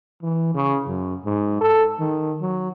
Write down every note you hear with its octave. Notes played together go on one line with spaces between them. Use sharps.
E3
C#3
F#2
G#2
A4
D#3
F#3